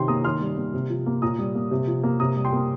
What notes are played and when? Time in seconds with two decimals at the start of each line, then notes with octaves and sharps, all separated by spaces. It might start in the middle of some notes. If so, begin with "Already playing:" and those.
Already playing: C3 D#3 G5 C6
0.08 A#3 A#5 D#6
0.24 D#3 C6 F6
0.41 G3
0.57 A#3
0.74 C3
0.90 F3
1.06 A#3
1.22 A#2 A#5 D#6
1.38 G3
1.55 A#3
1.71 C3
1.87 F3
2.03 A#3
2.20 C3 A#5 D#6
2.36 G3
2.45 G5 C6
2.53 A#3